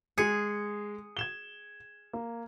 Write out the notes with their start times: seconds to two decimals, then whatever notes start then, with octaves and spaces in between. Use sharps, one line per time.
0.18 G#3 G#4 C7 C#7
1.17 G#6 E7 G7
2.13 A#3